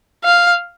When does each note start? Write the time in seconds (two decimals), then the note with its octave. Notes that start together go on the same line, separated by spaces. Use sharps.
0.25 F5